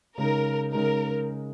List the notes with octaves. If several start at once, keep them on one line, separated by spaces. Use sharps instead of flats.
C#3 G#3 D#4 A#4
C#3 G#3 D#4 A#4